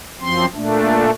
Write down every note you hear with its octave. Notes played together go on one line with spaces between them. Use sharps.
F#2 F3 C4 C6
A#2 A3 D4